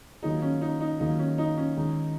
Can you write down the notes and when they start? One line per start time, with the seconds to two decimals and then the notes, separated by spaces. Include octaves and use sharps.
0.22 D#3 F#3 A#3 D#4 F4 G#4
0.42 C#4
0.61 D#4
0.80 D#4
1.00 D#3 F#3 A#3 D#4 F4 G#4
1.19 C#4
1.38 D#4
1.57 C#4
1.77 D#3 G#3 D#4